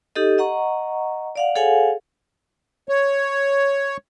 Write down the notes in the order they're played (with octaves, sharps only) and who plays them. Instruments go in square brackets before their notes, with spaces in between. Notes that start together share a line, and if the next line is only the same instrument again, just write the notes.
[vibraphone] D#4 G4 A4 D#5
D#5 F#5 A#5 C#6
D5 F5 F#5
G#4 A4 C#5 F5 F#5 G#5
[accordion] C#5